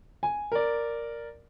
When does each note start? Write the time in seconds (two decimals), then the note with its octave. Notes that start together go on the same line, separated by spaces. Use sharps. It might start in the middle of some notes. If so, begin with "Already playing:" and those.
0.23 G#5
0.52 A#4 D5